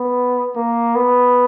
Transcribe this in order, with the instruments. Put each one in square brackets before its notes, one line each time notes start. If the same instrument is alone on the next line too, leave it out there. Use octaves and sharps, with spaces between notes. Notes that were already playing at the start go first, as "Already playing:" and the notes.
Already playing: [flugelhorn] B3
A#3
B3